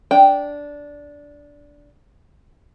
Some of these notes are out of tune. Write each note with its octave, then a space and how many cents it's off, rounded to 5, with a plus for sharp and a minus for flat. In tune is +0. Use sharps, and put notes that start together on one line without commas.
D4 -10 G5 +0